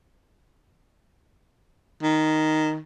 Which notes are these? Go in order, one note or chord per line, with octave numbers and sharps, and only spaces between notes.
D#3